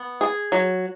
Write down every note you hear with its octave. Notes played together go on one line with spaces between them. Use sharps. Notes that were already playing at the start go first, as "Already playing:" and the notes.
Already playing: B3
G#4
F#3